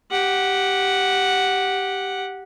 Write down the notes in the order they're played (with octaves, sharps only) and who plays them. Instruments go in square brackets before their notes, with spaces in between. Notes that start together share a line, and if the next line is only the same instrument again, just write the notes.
[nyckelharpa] G4 F#5